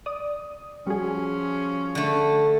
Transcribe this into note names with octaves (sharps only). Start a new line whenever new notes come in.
D5 D#6
F3 G3 C#4 F#4 G#4
D3 A3